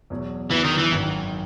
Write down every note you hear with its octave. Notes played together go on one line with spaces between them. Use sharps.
E2 B2 F#3
E2 B2 E3 F#3
D#3
E3
G#1 F#2 D#3